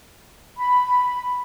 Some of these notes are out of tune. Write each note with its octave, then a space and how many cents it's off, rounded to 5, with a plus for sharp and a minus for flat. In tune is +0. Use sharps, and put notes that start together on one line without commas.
B5 +5